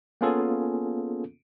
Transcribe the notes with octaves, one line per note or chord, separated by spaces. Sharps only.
A#3 B3 C#4 F4 G#4 A4